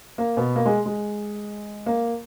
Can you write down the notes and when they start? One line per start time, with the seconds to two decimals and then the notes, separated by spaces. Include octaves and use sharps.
0.18 A#3
0.37 B2 B3
0.56 A#3
0.66 G#3
0.86 G#3
1.86 A#3